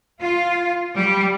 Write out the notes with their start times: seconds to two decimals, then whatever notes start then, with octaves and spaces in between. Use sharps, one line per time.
0.20 F4
0.96 G3